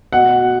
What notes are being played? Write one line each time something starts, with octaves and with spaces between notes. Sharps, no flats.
B2 F#5